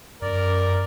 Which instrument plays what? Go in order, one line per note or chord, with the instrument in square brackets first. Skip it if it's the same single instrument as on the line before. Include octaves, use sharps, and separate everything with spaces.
[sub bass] F#2 [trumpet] A#4 [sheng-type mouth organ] D5